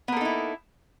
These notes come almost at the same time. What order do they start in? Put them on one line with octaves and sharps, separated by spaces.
B3 A#3 A4 D#4 E4